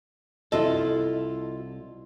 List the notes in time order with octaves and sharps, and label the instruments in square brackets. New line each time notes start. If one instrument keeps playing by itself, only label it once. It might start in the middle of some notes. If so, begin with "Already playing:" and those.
[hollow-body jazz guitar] C2 A4 [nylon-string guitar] E4 F4 D#5